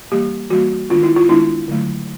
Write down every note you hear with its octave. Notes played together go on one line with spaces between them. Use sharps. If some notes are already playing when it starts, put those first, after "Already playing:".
E3 G3 A#3 G4
E3 G3 A#3 F#4
D#3 G#3 B3 D4 F4
E4
F4
D#3 G#3 B3 D4 E4
D3 F#3 A3